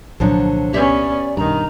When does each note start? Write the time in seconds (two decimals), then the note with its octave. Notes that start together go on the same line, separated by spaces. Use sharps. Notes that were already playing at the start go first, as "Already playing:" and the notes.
0.20 C2 A#2 D3 F3 F#3 D4
0.73 B3 C#4 G4 C#5 D5 E5
1.37 B1 G2 D#3 A#5